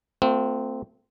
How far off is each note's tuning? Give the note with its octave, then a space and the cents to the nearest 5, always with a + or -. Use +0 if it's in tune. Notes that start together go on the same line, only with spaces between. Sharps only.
A3 +30 C4 -15 F4 +40